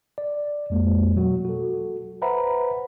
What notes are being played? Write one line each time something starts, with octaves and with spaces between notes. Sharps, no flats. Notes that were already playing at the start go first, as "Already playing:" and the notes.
D5
F2 G#3 A#3
B2 F#3 F#4
F#4 A4
B4 C5 E5 F#5 A#5 B5